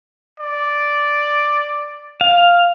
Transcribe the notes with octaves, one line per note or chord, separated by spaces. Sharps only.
D5
F5